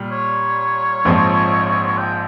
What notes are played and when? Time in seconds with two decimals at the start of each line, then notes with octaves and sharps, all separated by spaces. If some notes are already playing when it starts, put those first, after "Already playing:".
Already playing: A#2 G3
0.12 C#5
1.05 A#1 G#2 F3 C4
1.98 G5